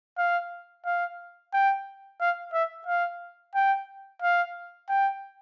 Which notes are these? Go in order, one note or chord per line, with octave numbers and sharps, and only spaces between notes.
F5
F5
G5
F5
E5
F5
G5
F5
G5